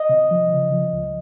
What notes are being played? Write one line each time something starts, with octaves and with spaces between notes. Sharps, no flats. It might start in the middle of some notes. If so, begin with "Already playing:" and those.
Already playing: D#5
C3
F3
C#3
F3
C#2